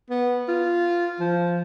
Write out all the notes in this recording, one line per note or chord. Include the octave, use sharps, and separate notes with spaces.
B3
F4
F3